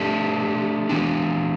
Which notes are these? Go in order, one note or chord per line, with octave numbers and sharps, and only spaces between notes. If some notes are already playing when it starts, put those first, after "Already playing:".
Already playing: A3 D4 G4
E3 B3 D4